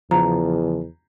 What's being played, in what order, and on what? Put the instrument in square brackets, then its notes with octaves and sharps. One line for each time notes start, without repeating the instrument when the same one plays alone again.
[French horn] E2 [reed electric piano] C#3 F3 [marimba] A#5